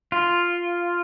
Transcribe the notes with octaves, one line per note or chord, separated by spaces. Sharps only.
F4